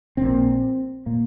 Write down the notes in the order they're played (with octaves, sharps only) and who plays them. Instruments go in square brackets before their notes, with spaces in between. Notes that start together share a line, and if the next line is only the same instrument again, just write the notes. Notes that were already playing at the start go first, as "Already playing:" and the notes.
[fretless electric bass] A#1 A#2 C4
A#2 A#3